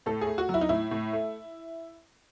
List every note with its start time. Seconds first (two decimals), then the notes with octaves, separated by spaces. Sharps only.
0.06 A2 A4
0.21 G#4
0.27 A3
0.38 F#4
0.49 F#3
0.54 E4
0.61 D#4
0.69 A2 E4
0.91 A2
1.13 A3